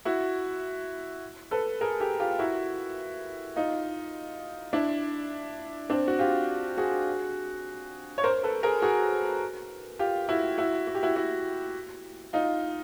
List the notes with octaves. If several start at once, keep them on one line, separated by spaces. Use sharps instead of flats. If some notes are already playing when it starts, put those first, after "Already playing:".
E4 F#4
A4 B4
G#4 A#4
G4 A4
F4 G4
E4 F#4
D#4 F4
D4 E4
C4 D4
F#4
F4 G4
F#4 G#4
C#5
A#4 C5
A4 B4
G#4 A#4
F#4 G#4
F4 G4
E4 F#4
E4 F#4
F#4
G4
E4 F#4
E4 F#4
D#4 F4